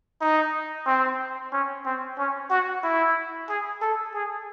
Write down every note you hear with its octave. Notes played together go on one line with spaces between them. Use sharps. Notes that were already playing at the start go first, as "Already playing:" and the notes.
D#4
C4
C#4
C4
C#4
F#4
E4
G#4
A4
G#4